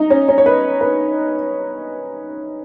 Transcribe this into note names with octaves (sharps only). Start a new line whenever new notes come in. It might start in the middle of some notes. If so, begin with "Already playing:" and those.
Already playing: D#4
C#4
C#4
C#5
B4
B4